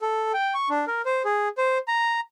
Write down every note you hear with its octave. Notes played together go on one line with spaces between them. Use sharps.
A4
G5
C#6
D4
A#4
C5
G#4
C5
A#5